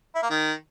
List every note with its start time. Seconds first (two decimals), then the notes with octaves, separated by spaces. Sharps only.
0.15 E4
0.23 A#3
0.30 D#3